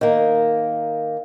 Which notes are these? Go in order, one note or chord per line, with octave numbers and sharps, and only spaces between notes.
D#3 A#3